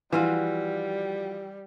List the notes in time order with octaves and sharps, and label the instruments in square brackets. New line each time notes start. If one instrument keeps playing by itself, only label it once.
[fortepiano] E3 [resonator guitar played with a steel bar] F3 F4 F#4 [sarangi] G3